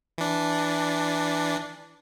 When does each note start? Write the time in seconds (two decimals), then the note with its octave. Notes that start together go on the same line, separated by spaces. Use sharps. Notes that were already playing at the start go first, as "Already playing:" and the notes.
0.18 E3 D4